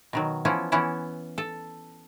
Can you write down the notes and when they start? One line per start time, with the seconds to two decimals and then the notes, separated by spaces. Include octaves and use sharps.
0.13 B2 D#3 F#3
0.45 E3 F3 B3 C#4 E4
0.72 E3 B3 C#4 E4
1.38 A4